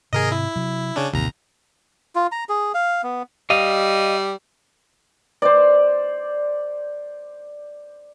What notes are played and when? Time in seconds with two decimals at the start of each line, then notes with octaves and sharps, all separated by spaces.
0.13 G#2 C3 D#3 G#4 A#4 D#5
0.32 E4
0.56 C3 F#3
0.96 C#3 C#4 D4
1.13 A1 D#2 C3 A#5
2.15 F4
2.32 A#5
2.49 G#4
2.74 F5
3.03 B3
3.50 G3 D#5 F5
5.42 C5 D5